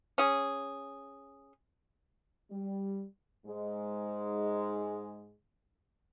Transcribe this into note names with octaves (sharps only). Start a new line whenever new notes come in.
C#4 G#4
G3
G#2 G#3